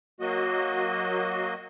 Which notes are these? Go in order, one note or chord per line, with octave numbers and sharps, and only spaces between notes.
F#3 A#3 F#4 D#5